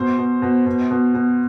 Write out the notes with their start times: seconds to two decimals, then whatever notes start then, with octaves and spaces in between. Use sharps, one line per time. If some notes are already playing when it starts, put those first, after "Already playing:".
Already playing: B2 C5
0.18 B2
0.42 B2
0.66 B2
0.91 B2
1.14 B2